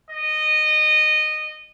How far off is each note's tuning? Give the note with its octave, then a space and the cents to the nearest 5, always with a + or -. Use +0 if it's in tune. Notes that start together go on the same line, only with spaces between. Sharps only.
D#5 -15